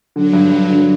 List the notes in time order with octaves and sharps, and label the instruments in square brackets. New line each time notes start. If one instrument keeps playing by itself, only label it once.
[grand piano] D3 [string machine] F#3
[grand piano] G2
G2
D3